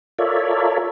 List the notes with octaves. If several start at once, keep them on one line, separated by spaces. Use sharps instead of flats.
F4 A4 A#4 C#5 D5 E5